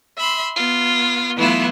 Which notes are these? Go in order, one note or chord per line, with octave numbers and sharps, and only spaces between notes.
E5 B5 C6
B3 F4
E3 F#3 A3 B3 E4 F4